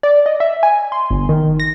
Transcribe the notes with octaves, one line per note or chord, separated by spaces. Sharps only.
D5
D#5
E5
G#5
C6
G1
D#3
A#6